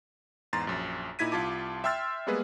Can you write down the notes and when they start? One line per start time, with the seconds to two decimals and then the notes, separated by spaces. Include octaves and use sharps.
0.53 E2 G#2 A#5 C6 A6
0.67 A#1 F#2
1.19 A#2 D#4 E4 G#6 B6 D#7
1.32 C2 F4 A5 D6
1.84 E5 G5 C6 E6 F6 A6
2.27 G3 G#3 A#3 B3 G#4 B4